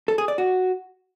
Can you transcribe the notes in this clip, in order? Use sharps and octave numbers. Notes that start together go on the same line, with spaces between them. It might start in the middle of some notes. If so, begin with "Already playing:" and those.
A4
G#4
D5
F#4